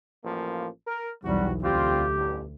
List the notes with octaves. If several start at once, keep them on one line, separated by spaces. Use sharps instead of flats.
A1 F3 A#3
A#4
B1 E2 C3 G3 F#4
D2 G3 C4 F4 G4
A1 G2